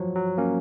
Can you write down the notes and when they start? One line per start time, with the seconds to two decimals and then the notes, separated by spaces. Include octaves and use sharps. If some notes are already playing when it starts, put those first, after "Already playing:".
Already playing: F3 F#3
0.15 F#3
0.38 A#3 C#4